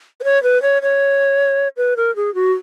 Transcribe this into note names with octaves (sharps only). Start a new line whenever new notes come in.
B4
C#5
B4
C#5
C#5
B4
A#4
G#4
F#4